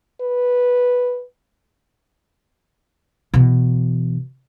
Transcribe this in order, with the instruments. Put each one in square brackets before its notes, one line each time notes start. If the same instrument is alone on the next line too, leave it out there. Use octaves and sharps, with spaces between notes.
[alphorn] B4
[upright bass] B2 E3